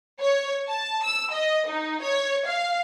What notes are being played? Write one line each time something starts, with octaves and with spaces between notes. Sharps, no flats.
C#5
A5
E6
D#5
D#4
C#5
F5